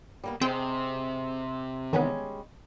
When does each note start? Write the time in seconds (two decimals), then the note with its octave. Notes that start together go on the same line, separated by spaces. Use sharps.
0.24 G3 A#3 B3
0.41 C3 C4 G#4 C5 D#5 G5
1.93 D#3 E3 G3 G#3 B3 C#4